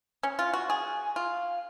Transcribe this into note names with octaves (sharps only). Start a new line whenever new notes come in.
C#4
F4
F#4
G#4
F4